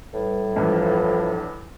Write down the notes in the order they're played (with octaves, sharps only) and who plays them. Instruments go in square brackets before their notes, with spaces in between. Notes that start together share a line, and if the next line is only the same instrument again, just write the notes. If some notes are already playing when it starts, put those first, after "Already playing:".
[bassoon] A2 [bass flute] G3 [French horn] B4
[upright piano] E2 G2 E3 [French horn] F3 [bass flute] B4